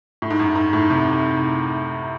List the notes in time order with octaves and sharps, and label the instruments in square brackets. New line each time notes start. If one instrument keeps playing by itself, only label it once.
[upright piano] A2
G#2
F#2
G#2
A2
C3